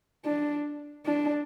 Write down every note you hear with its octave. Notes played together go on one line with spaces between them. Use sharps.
D4
D4